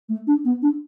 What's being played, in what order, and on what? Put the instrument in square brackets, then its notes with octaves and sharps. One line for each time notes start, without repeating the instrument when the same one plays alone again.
[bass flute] A3
D4
B3
D4